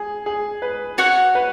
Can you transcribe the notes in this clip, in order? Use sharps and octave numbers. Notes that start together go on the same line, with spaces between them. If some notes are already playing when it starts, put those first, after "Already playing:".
Already playing: G#4
G#4
B4
F#4 C#5 F#5
B4